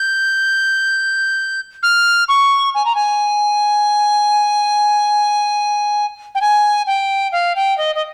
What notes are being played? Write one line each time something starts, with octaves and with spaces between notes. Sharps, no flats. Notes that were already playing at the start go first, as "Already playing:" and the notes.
Already playing: G6
F6
C#6
G#5
A#5
G#5
G5
G#5
G5
F5
G5
D#5
D#5